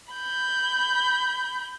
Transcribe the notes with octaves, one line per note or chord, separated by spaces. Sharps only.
B5 G6